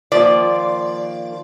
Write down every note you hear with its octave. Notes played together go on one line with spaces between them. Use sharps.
D#3 F3 A#3 D5